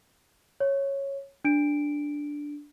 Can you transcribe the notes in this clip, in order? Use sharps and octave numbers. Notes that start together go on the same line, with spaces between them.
C#5
D4 D7